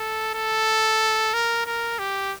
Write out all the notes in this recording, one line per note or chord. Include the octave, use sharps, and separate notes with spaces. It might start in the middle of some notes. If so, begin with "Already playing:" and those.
Already playing: A4
A4
A#4
A#4
G4